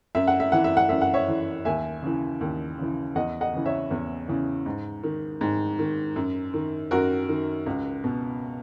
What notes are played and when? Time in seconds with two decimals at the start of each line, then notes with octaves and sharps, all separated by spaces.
0.15 F#2 E5
0.27 F#5
0.40 E5
0.52 E3 F#5
0.64 E5
0.77 F#5
0.89 F#2 E5
1.02 F#5
1.14 C#5 E5
1.28 E3
1.65 D#2 E5 G#5
2.02 C#3 E3
2.41 D#2
2.78 C#3 E3
3.15 E2 D#5 F#5
3.41 D#5 F#5
3.53 C#3 E3
3.66 C#5 E5
3.91 E2
4.28 C#3 E3
4.66 G#2
5.03 D#3
5.41 G#2
5.79 D#3
6.16 F#2
6.54 D#3
6.91 F#2 F#4 A#4
7.29 D#3
7.66 C#2
8.04 B2